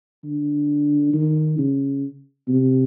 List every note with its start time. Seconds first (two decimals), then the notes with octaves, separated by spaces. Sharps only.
0.24 D3
1.14 D#3
1.58 C#3
2.49 C3